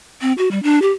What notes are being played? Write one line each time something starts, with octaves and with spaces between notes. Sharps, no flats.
C4
F#4
G3
D4
G4